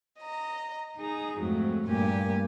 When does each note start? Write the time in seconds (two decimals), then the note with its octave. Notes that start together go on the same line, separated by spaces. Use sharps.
0.19 D#5 A#5
0.97 D#4 G#4 A#5
1.37 F2 G#2 F#3 A3
1.87 G2 A#2 A3 A#3 G4 G#5